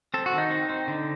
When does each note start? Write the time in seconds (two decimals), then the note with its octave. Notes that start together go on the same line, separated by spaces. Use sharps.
0.14 C4 A4
0.26 F#4
0.33 D#3
0.38 D#4
0.50 C4
0.69 C4
0.88 D3